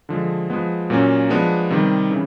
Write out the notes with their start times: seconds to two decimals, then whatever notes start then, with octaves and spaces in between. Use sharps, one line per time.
0.09 D3 F3 G#3
0.50 F3 G#3 B3
0.90 A#2 F#3 A#3 C#4
1.30 F3 G#3 B3 D4
1.70 C3 D#3 G3
2.11 C#3 E3